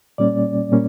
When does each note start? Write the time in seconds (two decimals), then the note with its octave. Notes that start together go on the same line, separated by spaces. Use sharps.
0.18 A#2 G3 A#3 C#4 D5
0.71 A#2 G3 A#3 C#4